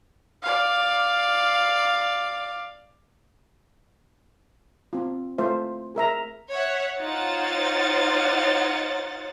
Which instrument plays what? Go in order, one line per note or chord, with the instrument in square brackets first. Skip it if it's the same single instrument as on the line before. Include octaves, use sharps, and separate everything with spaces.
[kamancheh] D5 F5
[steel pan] C4 F4
A3 F4 C5 E5
G#4 A#4 E5 A#5
[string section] C#5 E5 F#5
D#4 F4 C5 C#5 F#5 A6